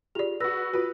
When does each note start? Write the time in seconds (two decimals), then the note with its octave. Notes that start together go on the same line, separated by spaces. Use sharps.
0.15 F4 G4 G#4 D5 F7
0.40 F#4 B4 E6 A#6
0.73 F4 F#4 B4